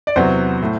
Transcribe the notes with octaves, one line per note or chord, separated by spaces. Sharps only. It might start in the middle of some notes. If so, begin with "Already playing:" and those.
D5
E2 C3 F#3 B3 C5
A2